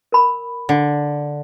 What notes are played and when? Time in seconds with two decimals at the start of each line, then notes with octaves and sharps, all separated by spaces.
0.12 A#4 B5
0.69 D3